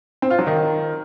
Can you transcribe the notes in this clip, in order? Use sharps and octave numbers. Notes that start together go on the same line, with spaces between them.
C4
F4
F#3
D#3